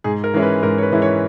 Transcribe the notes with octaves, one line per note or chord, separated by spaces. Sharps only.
G#2 G#4
A#4
E3 G#3 C#4 E4
B4
G#2 A#4
C#5
B4
E3 G#3 C#4 E4
C#5